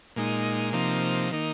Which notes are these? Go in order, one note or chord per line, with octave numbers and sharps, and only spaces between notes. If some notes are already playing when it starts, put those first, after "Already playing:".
A#2 G#3 D#4
C3 F3 A#3 D#4
D#3 A#3 D#4